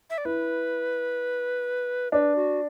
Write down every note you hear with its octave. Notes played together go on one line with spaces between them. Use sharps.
E5
D5
E4 B4
D4 B4
F#4